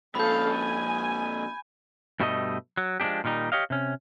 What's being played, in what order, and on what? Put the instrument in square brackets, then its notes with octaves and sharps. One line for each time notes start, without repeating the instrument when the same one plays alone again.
[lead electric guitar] F2 A#2 [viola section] C#4 A4 F5 [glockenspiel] B5 G6
[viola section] G#5
[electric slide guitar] G2 B2 G3 A3 F#4 D#5
F#3
F3 G#3 B3 D4 G4
A#2 D#3 G3 D#4
G4 C#5 D#5 F5
C3 C#4